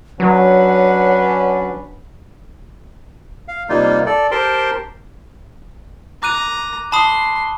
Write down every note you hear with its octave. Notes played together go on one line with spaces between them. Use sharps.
F#3 C#4 D4 B4 F#5
F5
C3 G3 A#3 D#4 F4
A4 D5
G4 A#4 C5 G5 A5 C6
A#5 D6 F#6 D#7
A5 B5 C6 D#6